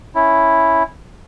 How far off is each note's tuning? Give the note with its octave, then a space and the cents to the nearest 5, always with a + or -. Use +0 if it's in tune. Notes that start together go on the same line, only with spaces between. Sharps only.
C#4 +0 E4 +0